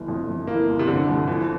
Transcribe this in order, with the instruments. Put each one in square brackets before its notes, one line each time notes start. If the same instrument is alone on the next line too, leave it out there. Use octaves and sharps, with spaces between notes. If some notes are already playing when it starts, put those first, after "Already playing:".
Already playing: [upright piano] G1 E3
F2
G1
[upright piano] E3 [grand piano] A#3
[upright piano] G1
[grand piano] C3
[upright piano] F2 [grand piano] D3
[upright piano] G1
[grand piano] E3 [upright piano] F3